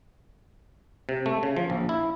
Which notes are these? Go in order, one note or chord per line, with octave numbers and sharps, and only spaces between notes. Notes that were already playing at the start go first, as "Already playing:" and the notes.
C3
A3
C#3
F3
A#1
E4